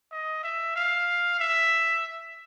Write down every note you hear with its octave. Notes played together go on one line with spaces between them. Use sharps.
D#5
E5
F5
E5